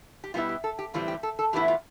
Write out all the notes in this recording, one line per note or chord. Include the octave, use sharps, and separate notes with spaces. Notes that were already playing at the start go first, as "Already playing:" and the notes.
G4
B2 G3 B3 E4 F4
G4
A4
G4
A2 E3 G3 C4 F4
G4
A4
A4
A2 E3 G3 B3 E4 G4
F4